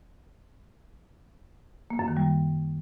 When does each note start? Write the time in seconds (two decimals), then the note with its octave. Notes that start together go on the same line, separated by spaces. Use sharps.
1.90 A#3
1.99 F#2
2.08 D#3
2.17 G3